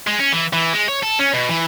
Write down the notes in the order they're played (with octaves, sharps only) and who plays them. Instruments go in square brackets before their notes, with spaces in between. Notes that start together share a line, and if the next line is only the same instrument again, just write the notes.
[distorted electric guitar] G#3
C#4
E3
E3
G#3
C#5
A4
C#4
B2
E3